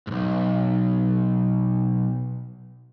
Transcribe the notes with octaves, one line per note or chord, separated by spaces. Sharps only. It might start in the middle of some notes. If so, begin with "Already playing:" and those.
B1 G#2